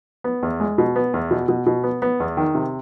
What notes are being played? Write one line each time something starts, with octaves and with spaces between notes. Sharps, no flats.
B3
E2
G#3
B2
B3
E2
B2
B2
B2
B3
B3
E2
D#3
C3